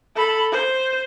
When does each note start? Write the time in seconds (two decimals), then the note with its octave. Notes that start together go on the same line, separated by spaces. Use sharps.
0.15 A4 B5
0.51 C5